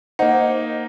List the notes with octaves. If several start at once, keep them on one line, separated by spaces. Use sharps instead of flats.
A#3 D#4 C5 D#5 F#5